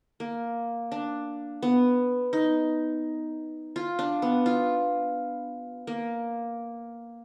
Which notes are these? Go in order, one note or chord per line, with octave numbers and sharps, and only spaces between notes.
A#3
D4
B3
D#4
F4
D4
B3
F4
A#3